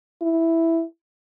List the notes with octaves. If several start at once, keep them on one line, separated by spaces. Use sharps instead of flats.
E4